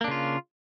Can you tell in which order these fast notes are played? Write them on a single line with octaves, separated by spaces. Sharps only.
A#3 D4 C#3 F4